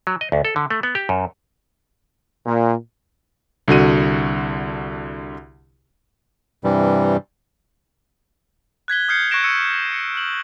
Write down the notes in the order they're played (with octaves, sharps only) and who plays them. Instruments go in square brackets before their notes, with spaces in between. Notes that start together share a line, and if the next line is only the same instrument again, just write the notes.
[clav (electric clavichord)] F#3
D#5
D2
A4
D3
A3
B3
G4
F#2
[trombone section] A#2
[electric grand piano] C2 D3 F#4 D#7
[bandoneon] G2 C3 E3 G3
[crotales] F#6 G#6 B6 G7
D#6 F6 G6 G#6 C7 C#7
C#6 F#6 G#6 A#6 D7 E7
C#6 E6 C#7 D#7
C#7
F6 F#7